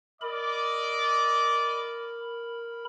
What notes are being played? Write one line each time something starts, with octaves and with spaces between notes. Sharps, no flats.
A#4 D5 D#5 B5 D6